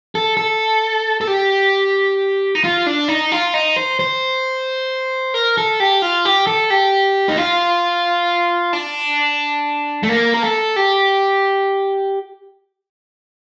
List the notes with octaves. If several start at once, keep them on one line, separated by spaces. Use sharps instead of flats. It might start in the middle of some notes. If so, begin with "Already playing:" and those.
A4
A4
A4
G4
D#4
F4
D4
D#4
F4
D#4
C5
C5
A#4
A4
G4
F4
G4
A4
G4
D#4
F4
D4
A3
A#3
A#4
A4
G4